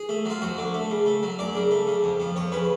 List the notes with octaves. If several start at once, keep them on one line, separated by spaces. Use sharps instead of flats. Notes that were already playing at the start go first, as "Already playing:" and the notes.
Already playing: G#4
A3
F#3 F4
F2 F#4
D3
A3
C#3
A3
F#3
F#2 D5
C#3
A3
C#3
F2
F3
F2 C#5
C#3 B4